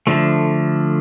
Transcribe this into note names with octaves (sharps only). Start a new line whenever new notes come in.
D3 F3 A3